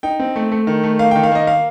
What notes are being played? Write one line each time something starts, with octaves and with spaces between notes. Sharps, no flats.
D#4 G5
C4
A3
A3
D#3
A3
A#3 F5
D#3 G5
F5
A#3 D#5
F5